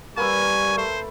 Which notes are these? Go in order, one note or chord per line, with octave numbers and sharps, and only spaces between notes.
G3 A#3 B4 G#5 C#6 E6
A3 C5